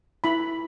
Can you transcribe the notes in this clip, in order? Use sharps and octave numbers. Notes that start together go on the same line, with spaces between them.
E4 B5